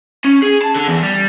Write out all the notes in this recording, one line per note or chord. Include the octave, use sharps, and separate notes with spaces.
C#4
G#4
A5
D3
E2
G3